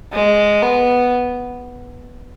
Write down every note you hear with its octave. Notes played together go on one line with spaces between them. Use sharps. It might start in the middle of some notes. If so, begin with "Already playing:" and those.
G#3
B3